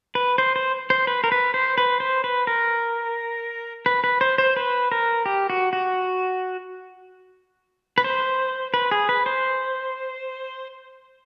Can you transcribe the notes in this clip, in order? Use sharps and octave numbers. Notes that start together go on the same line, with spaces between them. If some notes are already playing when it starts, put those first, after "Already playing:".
B4
C5
C5
C5
B4
A#4
B4
C5
B4
C5
B4
A#4
B4
B4
C5
C5
B4
A#4
G4
F#4
F#4
B4
C5
B4
G#4
B4
C5